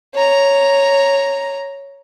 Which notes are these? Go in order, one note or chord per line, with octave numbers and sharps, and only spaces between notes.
C#5 A#5